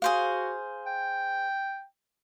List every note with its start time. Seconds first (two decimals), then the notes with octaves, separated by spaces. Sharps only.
0.02 F#4 G#4 C5 F5
0.86 G5